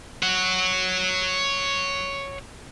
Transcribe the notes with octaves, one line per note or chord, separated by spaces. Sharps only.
C#5 F#5